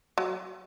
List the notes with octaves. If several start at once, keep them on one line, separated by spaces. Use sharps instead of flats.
F#3